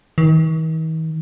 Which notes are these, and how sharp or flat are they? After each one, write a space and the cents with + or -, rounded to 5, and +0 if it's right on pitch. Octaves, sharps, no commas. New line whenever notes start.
D#3 +45